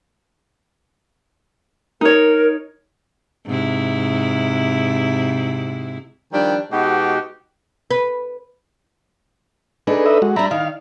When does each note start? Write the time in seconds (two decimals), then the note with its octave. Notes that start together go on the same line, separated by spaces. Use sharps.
2.01 D#4 A#4 C#5
3.46 G#2 C3 E4
6.32 D#3 F3 G3 D4 G5
6.71 B2 G#3 B3 D#4 F#4 G4
7.91 B4
9.87 D4 D#4 G#4 A4 B4
10.06 B4 D#5 E5
10.22 G#3 F#4
10.36 G3 D4 E5 A#5 B5
10.51 D#3 F5